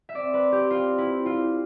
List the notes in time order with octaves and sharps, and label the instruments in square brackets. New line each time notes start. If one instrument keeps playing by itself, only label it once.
[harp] E5
[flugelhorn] C4 [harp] D5
[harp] B4
G4
F4
E4
F4